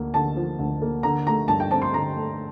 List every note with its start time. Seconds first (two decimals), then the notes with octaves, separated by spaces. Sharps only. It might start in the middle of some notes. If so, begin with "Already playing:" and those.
Already playing: D2 D3 A#3
0.14 D3 A5
0.36 F3
0.59 D2
0.82 A#3
1.03 D3 A#5
1.27 A3 A#5
1.48 G2 A5
1.60 G5
1.71 C4 A5
1.82 C6
1.93 D3 A#5
2.16 A3